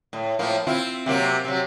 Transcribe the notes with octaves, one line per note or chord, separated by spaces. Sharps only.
A2
A2 F3 A#3
C4 E4 F4
C3 F#3 A#3
C3 F#3